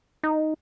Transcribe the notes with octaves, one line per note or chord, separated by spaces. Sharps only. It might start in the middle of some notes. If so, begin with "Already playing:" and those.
D#4